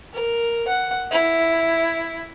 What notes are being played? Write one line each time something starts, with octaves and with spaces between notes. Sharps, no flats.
A#4
F#5
E4